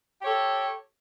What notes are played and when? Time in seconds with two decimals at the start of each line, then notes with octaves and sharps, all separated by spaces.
0.20 G4
0.23 C#5
0.26 A4